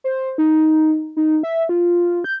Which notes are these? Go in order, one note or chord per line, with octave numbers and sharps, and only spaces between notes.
C5
D#4
D#4
E5
F4
G6